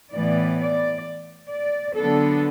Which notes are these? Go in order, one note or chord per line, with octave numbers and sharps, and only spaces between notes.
A2 E3 B3 D5
D5
D5
D3 F#3 B3 D4 A4